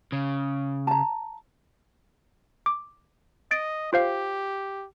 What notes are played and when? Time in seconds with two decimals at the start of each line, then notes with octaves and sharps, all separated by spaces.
0.12 C#3
0.87 A5 A#5
2.66 D6
3.51 D#5 A6 D7
3.93 F4 G4 C5 F5